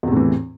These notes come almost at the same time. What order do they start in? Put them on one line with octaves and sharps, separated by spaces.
E2 C3 A2 E3